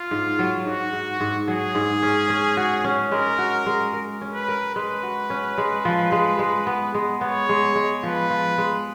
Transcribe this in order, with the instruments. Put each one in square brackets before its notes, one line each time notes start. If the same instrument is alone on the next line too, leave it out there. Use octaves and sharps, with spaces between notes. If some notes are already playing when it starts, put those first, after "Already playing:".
Already playing: [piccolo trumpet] F4
[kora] G#2
F#3
[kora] G#2 [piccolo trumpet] F#4
[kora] G#2
G#2
[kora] F#3 [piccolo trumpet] G#4
[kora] G#2
C#4
C#4
F#4
C#4
[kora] G#3 [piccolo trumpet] A#4
[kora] F#4
G#3
A#4
C#4
[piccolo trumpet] B4
[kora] A#4
[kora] G#3 [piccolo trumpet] B4
[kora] F#4
C#4
G#3
F3
G#3
G#3
B3
G#3
[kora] B3 [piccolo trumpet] C#5
[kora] G#3
G#3
[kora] F3 [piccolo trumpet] B4
[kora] F3
G#3